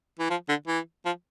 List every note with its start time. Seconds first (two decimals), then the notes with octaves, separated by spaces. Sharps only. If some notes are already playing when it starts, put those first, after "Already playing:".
0.19 E3
0.30 F3
0.49 D3
0.67 E3
1.05 F3